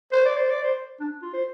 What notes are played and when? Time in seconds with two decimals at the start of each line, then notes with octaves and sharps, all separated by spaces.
0.12 C5
0.25 D5
0.37 C5
0.50 D5
0.63 C5
1.00 D4
1.22 F4
1.34 C5